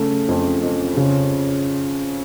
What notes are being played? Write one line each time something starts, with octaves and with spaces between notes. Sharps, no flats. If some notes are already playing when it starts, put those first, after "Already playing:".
Already playing: C#3 A3
F2
F2
C#3